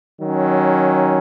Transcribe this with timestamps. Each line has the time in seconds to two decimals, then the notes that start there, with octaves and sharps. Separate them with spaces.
0.19 D#3 F#3 C#4